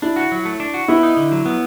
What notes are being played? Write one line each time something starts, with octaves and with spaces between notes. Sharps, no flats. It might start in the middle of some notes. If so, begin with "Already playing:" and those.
D4 E4
F#4
F#3
A3
D4
F#4
B3 E4
D#4
D3
F#3
B3